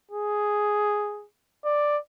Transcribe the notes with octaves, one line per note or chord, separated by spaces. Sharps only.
G#4
D5